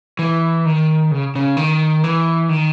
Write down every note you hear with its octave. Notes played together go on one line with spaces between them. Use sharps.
E3
D#3
C#3
C#3
D#3
E3
D#3